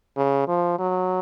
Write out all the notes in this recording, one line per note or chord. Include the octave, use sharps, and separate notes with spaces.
C#3
F3
F#3